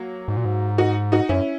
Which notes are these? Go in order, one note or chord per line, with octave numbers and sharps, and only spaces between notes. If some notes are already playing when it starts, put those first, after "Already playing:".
Already playing: F#3 A#3
G#2
A#2
G#2
D#4 F#4
D#4 F#4
F#2 C#4 E4